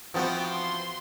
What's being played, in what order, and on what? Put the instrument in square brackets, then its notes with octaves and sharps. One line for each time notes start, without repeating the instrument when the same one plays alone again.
[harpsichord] E3 C4 F#4 [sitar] F3 B3 [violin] G5
[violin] C6